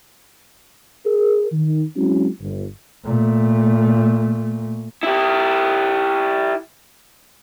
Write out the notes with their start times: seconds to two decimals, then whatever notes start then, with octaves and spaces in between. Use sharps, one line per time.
1.06 G#4 A#4
1.52 D#3
1.96 F#3 G#3 C4 C#4 E4 F#4
2.41 G1
3.06 A#2 A3
5.03 E4 G4